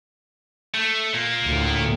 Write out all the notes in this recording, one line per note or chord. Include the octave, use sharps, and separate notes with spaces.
A3
A#2 A#3
D2 A2